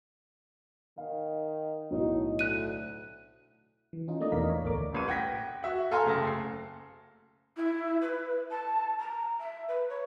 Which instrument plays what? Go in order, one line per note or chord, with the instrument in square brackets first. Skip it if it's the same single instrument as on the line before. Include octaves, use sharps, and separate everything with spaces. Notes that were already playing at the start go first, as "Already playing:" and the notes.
[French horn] D#3 [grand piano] F5
[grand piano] B1 A2 C#5 [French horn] D#4
[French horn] D2 [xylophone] F#6 D#7
[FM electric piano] E3
C#4 D#4 F4
A3 A#3 D4 D#4 D5 D#5
E2 B2 E3 A#4 F5 B6
A#4 C#5
A1 D2 A3 A#4 D5 D6
[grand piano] D#1 A1 D#7
F#5 G5 G#6 A#6 B6
F#4 E5 F#5
A4 F5 G#5 A#5 C6 F6
F#1 A3 G5 A5 A#6
C7
[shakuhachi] E4
B4
A5
A#5
E5
B4
C#5